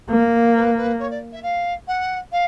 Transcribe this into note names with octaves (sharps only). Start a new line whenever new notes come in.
A#3
B4
B4
C#5
D5
E5
F5
F#5
F5